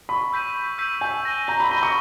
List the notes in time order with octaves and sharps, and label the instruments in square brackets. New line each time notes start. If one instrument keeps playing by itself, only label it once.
[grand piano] B5 [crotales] C#6
[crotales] E6 G6 B6 D#7
C#6
E6 G6 B6 D#7
[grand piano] G#5 [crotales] G6
[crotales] A#6 D#7 G7
[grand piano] A#5 [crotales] G6
[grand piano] B5
[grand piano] B5 [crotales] A#6 D#7 G7
[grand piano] C#6